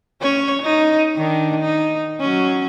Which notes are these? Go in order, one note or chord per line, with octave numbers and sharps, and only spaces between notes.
C#4 C#5
D#4
D#3 D4
D#4
F#3 C#4